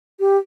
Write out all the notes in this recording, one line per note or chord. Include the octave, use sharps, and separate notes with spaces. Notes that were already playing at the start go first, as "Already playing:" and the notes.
G4